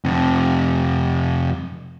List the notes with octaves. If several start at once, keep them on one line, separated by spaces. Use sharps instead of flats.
F2 C3